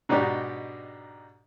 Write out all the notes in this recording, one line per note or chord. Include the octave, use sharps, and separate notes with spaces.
G#2 B2 D4 D#4 G4